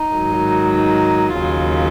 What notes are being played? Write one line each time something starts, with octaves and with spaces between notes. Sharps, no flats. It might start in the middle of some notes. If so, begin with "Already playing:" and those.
Already playing: D#4
G#2 D#3 F#3
D#4
D#2 C#3 F#3 F4